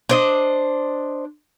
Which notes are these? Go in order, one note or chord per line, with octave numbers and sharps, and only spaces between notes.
D4 C5 D#5